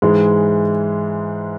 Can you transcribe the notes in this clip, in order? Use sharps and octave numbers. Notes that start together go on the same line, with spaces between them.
G#2 E3 G#3